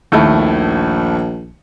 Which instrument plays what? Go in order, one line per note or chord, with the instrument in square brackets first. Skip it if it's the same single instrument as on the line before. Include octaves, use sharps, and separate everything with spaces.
[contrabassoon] A#1 [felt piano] D#2 A3 E4